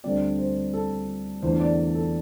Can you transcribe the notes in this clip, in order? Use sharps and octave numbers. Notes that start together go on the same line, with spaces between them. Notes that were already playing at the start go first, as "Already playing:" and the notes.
D2 D3 G3 C4 D5
C5
A4
E2 D3 A3 C5
D5
A4